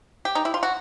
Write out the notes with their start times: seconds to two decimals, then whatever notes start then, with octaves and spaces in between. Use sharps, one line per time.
0.25 G4
0.35 D#4
0.45 E4
0.54 F4
0.63 F#4